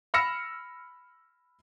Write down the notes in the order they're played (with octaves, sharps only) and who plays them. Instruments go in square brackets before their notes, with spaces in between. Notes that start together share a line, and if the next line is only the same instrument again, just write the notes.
[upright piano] B5 E6 F6 A#6 C#7 E7